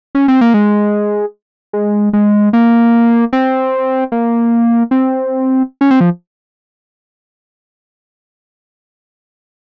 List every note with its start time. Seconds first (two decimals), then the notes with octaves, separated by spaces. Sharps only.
0.15 C#4
0.28 C4
0.41 A#3
0.54 G#3
1.73 G#3
2.13 G#3
2.53 A#3
3.33 C4
4.12 A#3
4.91 C4
5.81 C#4
5.91 C4
6.01 F3